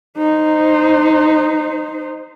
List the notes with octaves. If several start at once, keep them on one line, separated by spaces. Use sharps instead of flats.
D#4 C5